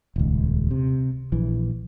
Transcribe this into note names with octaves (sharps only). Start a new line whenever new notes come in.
D#1 C#2
C3
A#1 E3